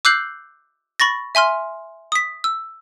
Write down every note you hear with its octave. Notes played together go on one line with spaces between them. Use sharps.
D6 E6 F#6 G6 C7 F#7
B5 C#6 A6 A#6
E5 G#5 C6 F6
D#6 B6
E6